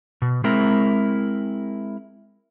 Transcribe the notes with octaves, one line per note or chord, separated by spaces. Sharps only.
B2
G#3 C4 E4 A#4